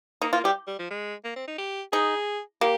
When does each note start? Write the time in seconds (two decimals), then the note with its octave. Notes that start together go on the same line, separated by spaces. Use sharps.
0.22 A#3 D#4
0.33 A#3 F4
0.44 G3 G4
0.67 G3
0.79 F3
0.91 G#3
1.25 A#3
1.36 C4
1.48 D#4
1.58 G4
1.93 D#4 G#4
2.61 A#3 G4